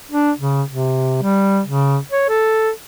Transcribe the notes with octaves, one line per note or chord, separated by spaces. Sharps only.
D4
C#3
C3
G3
C#3
C#5
A4